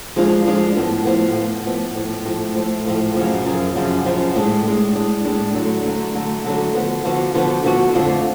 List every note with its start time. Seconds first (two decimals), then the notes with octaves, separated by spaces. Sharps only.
0.16 F3 G#3 D4 F4
0.46 F3 G#3 D4 F4
0.76 A2 F3 B3
1.05 A2 F3 B3
1.35 A2 F3 B3
1.66 A2 F3 B3
1.95 A2 F3 A3
2.25 A2 F3 A3
2.55 A2 F3 A3
2.86 A2 F3 A3
3.15 F#2 C#3 F3
3.45 F#2 C#3 F3
3.75 F#2 C#3 F3
4.05 F#2 C#3 F3
4.35 A2 G#3 D4
4.65 A2 G#3 D4
4.95 A2 G#3 D4
5.25 A2 G#3 D4
5.55 D3 F#3 A3 D4
5.85 D3 F#3 A3 D4
6.14 D3 F#3 A3 D4
6.44 D3 F#3 A3 D4
6.74 D3 F3 B3 F#4
7.04 D3 F3 B3 F#4
7.34 D3 F3 B3 F#4
7.64 D3 F3 B3 F#4
7.94 F2 D3 F3 A3 F4